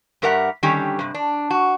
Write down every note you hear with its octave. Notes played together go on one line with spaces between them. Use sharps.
G2 G4 A#4 E5 F#5
D3 D#3 G3 C#4 G4
G2 C3
D4
F#4